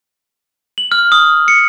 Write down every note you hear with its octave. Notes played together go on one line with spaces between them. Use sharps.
F#7
F6
D#6
C#7